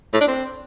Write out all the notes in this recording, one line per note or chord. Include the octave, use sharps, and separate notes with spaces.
A2
D4
C4